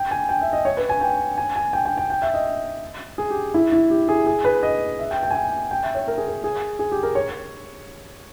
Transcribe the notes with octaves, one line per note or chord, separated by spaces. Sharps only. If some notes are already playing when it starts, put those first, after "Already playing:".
Already playing: G5
G#5
G5
E5
D#5
C#5
B4
G#5
G5
G#5
G#5
G5
G5
G5
G5
E5
D#5
G#4
G4
E4
E4
G4
G#4
G#4
B4
D#5
E5
G5
G5
G#5
G5
G5
E5
C#5
A#4
G#4
A#4
G#4
G#4
G4
A#4
C#5